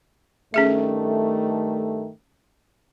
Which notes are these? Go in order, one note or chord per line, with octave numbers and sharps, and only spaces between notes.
G2 D#3 A3 C#4 G#4 E5